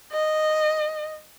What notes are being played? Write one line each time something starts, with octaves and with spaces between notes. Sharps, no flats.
D#5